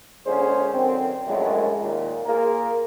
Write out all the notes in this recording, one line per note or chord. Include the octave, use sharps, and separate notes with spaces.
A#1 D3 G#3 C#4 G#4 C5
F#2 D3 D#3 C4
A#1 F#2 A2 G#3
D#2 A#2
A#3 F4 G#4 A#4